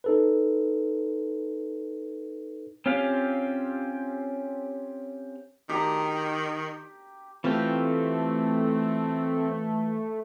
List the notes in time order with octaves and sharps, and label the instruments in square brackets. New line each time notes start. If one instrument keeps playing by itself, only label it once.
[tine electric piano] D#4 A4 B4
[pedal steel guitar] C4 C#4 F4 G4 F5
[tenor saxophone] D#3 [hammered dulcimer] G4 A#5
[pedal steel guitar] E3 F4 G4 [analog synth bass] A3 [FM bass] C4